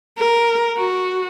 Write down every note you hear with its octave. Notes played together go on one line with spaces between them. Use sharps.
A#4
F#4